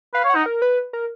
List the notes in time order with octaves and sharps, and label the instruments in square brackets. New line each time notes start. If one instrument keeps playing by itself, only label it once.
[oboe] B4 [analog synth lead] F5
[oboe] C#5
[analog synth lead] F#5
[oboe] D#4
[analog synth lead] A#4
B4
A#4